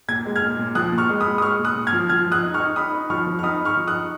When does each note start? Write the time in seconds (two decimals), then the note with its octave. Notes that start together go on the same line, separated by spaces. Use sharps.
0.08 A#2 G#6
0.25 G#3
0.36 F6 G#6
0.42 A#2
0.59 A#2
0.75 F3 D#6 F#6
0.92 A#2
0.98 C#6 F6
1.09 G#3
1.20 B5 D#6
1.26 G#3
1.38 D#6
1.42 G#3 C#6 F6
1.59 A#2
1.65 D#6 F#6
1.76 A#2
1.87 F6 G#6
1.93 F3
2.09 F3 F6 G#6
2.26 F3
2.32 D#6 F#6
2.43 D#4
2.54 C#6 F6
2.60 D#4
2.76 D#4 B5 D#6
2.94 D#4
3.10 F3 C#6 F6
3.26 F3
3.39 F6
3.43 D#4 B5 D#6
3.60 D#4
3.65 C#6 F6
3.77 F3
3.87 D#6 F#6
3.94 D#4